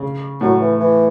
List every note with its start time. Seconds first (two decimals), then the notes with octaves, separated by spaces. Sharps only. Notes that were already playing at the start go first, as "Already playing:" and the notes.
Already playing: C#3
0.41 A2 F#3
0.61 E3
0.80 E3